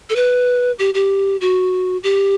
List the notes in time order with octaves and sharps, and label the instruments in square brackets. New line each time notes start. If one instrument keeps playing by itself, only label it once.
[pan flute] A4
B4
G4
G4
F#4
G4